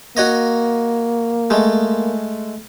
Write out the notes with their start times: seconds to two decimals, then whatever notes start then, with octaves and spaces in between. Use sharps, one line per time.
0.17 A#3 F#4 C#5 D#5
1.50 G#3 A3